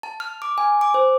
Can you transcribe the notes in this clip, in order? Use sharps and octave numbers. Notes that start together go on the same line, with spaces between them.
A5
F6
D6
G#5
D6
C5